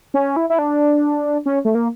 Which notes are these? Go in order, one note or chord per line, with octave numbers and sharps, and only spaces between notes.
C#4
E4
E4
D4
C#4
A3
A#3